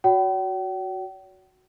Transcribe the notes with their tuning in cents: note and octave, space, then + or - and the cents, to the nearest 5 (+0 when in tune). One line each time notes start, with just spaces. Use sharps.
F#4 +0 C#5 +45 G5 -45